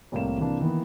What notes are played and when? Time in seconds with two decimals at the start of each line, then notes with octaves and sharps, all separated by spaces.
0.12 C2 A2 C3 A#3 E7
0.38 C3 E3 A#3 D4
0.59 D#3 E3 A#3 B3